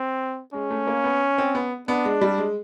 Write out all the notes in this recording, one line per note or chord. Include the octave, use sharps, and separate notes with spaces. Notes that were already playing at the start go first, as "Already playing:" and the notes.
Already playing: C4
G#3 C#4
A3
A#3
B3
C4
B3
B3 D4
G#3
G3
G#3